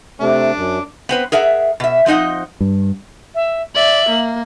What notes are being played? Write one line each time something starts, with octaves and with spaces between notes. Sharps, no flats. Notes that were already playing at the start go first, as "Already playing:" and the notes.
C3 A3 D4
F#2
B3 C4 B4
G#4 A#4 E5 F#5
B2 E5
F3 C4 D#4 D#5 F#5
G2
E5
D5 E5 F#7
A#3